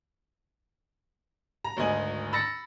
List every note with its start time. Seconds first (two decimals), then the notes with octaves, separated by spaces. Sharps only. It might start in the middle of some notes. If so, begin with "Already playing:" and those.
1.64 A#5
1.77 G#1 D2 D#5 G#5 F#7
2.33 B5 E6 A6 A#6 C#7